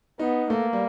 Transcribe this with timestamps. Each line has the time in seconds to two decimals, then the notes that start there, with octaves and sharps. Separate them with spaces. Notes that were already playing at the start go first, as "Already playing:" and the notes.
0.19 B3 D#4
0.50 A3 A#3
0.73 G3